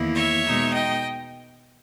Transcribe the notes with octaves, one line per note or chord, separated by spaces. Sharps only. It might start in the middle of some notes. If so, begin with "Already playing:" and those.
Already playing: E2 D#3 A#3 E4
C#5 E5
B2 G#3 D#4
D#5 G5